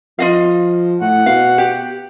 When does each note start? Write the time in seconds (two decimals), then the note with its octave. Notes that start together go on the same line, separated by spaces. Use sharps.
0.19 F3 F4 D#5 F5
1.01 A2 F#5
1.26 B2 F5
1.58 G4